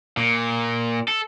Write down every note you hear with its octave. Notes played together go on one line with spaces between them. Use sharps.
A#2
A4